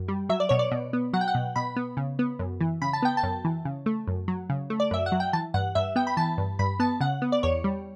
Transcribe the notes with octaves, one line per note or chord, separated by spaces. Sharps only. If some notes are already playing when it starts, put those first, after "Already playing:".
Already playing: F#2
G3
F#3 E5
D5
B2 C#5
D5
B2
B3
F#3 F#5
G5
F#5
B2
B2 B5
B3
C#3
B3
F#2
E3
C#3 B5
A5
B3 G5
A5
F#2
E3
C#3
A3
F#2
F#3
C#3
A3
D5
F#2 E5
F#5
F#3
G5
E3 A5
G2 F#5
G2 E5
B3 G5
B5
E3 A5
G2
G2 B5
B3 A5
C#3 F#5
B3
D5
E2 C#5
G3